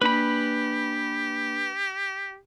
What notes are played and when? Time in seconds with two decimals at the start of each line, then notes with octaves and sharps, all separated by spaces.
0.02 A#3 D4 G4 B4 B5